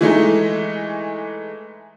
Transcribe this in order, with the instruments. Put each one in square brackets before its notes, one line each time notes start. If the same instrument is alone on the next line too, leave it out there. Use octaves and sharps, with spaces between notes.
[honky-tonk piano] E3 G#3 A3 D#4